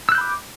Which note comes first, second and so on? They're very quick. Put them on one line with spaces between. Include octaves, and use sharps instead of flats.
E6 F#6 G6 B5 D6